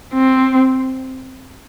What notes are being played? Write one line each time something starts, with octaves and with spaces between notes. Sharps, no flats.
C4